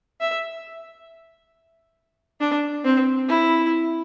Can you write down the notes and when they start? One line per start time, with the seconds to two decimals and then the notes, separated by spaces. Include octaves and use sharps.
0.20 E5
2.40 D4
2.84 C4
3.28 E4